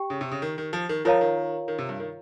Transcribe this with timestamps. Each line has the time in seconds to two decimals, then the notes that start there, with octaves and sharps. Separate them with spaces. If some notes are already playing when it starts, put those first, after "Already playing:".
Already playing: G4 G5 C#6
0.10 C#3
0.21 C3
0.31 C#3
0.42 D#3
0.58 D#3
0.73 F3
0.89 D#3
1.05 F3 F4 A#4 C#5 F5 A#5
1.21 D#3
1.68 D#3
1.78 C3
1.89 G2
2.00 D#3